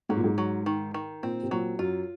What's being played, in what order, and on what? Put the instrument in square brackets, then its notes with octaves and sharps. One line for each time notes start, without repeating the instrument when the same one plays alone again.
[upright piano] G#2 [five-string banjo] F#3
[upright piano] A#2
G#2
[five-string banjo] F#3
D#3
D#3
[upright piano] A#2 [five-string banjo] C4
[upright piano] C3
[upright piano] A#2 [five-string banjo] F#3
[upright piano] F#2 [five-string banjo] F4